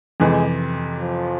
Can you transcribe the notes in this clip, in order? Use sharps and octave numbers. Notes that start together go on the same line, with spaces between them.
F2 C3 E3 G#3
F3